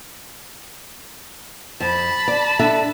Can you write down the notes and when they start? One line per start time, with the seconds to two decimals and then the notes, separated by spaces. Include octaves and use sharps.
1.80 F2 A5 B5
2.28 D5
2.59 D4 A4 E5